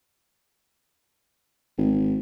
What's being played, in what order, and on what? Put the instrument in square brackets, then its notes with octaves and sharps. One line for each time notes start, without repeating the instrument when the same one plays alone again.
[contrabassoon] G#1